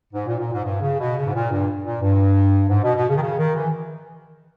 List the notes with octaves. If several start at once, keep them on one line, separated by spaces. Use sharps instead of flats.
G#2
A#2
A#2
G#2
G2
C#3
B2
C#3
G#2
A#2
G2
A#2
G2
G#2
B2
B2
C#3
D#3
C#3
D#3
E3